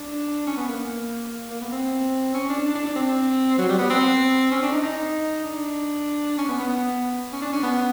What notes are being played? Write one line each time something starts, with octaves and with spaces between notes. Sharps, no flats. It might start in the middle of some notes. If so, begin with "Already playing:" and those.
Already playing: D4
C#4
B3
A#3
A#3
B3
C4
C#4
D4
D4
D4
D4
C4
F#3
G3
B3
C4
C#4
D4
D#4
D#4
D4
C#4
B3
B3
C#4
D4
C#4
B3